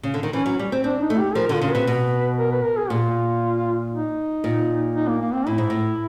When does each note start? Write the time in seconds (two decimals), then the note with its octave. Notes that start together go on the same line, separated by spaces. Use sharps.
0.03 C#3
0.14 D3
0.23 D#3
0.33 E3 C#4
0.46 F#3
0.59 G3
0.72 C4
0.84 C4 D4
1.02 D#4
1.10 A3
1.18 G4
1.35 F3 A#4
1.49 D3
1.54 F4
1.62 C#3
1.70 C3 B4
1.87 B2
2.39 A#4
2.52 B4
2.64 A#4
2.77 G#4
2.90 A#2 F4
3.93 D#4
4.44 A#2
4.95 D#4
5.08 A#3
5.21 A#3
5.34 C4
5.47 A2 E4
5.58 G#2
5.70 A2